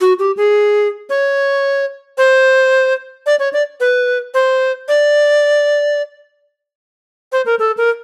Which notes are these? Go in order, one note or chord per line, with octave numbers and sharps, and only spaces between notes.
F#4
G4
G#4
C#5
C5
D5
C#5
D5
B4
C5
D5
C5
A#4
A4
A#4